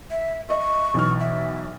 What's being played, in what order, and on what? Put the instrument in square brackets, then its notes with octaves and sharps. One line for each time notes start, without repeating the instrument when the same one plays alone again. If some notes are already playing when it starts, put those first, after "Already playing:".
[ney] E5
[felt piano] D#5 E5 [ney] C#6
[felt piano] B1 E3 F6
[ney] E5